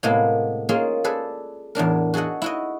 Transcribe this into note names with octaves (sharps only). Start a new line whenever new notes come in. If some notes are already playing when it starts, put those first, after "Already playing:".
A2 C3 G#3 A#3 B3
A#3 C#4 F4 G#4 D#5 F5
G#4 A4 B4 D5
E2 A2 D4 A#4
F#4 G#4 A4 D#5 F#5
E4 F#4 D#5